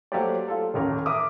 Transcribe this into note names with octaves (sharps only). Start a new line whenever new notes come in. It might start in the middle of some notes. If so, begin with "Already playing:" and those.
F#3 A3 A#3 G4 C5 D5
F4 A4
D#1 A1 A#4
A#4 E5 D6 D#6